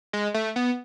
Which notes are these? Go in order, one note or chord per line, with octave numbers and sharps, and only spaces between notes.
G#3
A3
B3